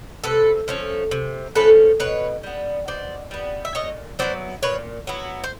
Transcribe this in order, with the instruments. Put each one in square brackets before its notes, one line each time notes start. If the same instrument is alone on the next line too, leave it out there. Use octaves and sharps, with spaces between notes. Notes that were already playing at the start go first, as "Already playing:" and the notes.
[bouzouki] C3 A4 B4
F3 A3 C#4
C3
F3 A3 C#4 A4 B4
B2 B4 C#5
G3 B3
B2 C5 D5
G3 B3
E5
A#2 C#5 D#5
F#3 B3 E4 C5 D5
A#2 B4 C#5
F#3 B3 E4
C5